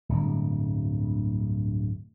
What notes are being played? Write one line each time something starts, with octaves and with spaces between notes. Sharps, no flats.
D1 G1 D2